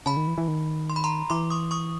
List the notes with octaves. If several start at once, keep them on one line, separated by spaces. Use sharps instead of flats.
C#3 A5 B5
D#3
E3
E3
D#3
C6
B5
A#5 C6
E3 C6 D6
C#6 D#6
C#6 D#6